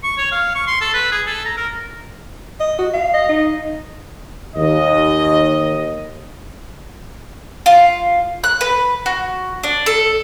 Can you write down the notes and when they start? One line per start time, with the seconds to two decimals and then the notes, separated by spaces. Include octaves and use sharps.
0.03 C#6
0.18 C#5
0.32 F5
0.55 C#6
0.68 C6
0.81 A4
0.94 B4
1.12 G#4
1.27 A4
1.45 A#5
1.57 A#4
2.60 D#5
2.79 F#4
2.94 F5
3.14 D#5
3.29 D#4
4.56 D#2 D#5
7.66 F4
8.44 F#6
8.61 B4
9.06 F#4
9.63 D4
9.86 A4